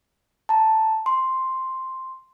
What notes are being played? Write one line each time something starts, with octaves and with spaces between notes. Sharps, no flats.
A5 A#5
C6